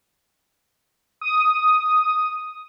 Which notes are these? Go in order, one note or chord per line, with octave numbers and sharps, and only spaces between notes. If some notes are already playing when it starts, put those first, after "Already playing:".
D#6